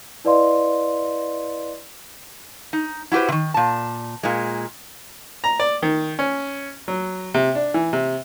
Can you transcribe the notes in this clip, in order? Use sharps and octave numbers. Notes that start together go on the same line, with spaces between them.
E4 B4 D5 D#5 F5 C6
D#4
E4 F#4 G4 B4 C5
C3 D#3
A#2 A5
A#2 G#3
A#5
D5
D#3
C#4
F#3
C3
D4
E3
C3